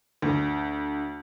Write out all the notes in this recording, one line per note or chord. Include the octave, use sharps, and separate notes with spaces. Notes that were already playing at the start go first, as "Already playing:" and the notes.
D2